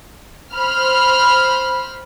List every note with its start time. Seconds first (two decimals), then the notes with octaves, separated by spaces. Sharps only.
0.53 C5 B5 F6